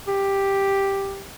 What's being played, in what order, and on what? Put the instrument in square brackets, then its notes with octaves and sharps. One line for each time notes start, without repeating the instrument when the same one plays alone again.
[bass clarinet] G4